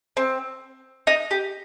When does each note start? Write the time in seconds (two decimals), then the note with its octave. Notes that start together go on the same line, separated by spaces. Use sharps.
0.17 C4
1.07 D#4
1.31 G4